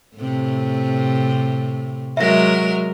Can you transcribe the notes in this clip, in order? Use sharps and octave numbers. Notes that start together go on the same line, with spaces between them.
A2 C3
F#3 G#3 A#4 E5 A#6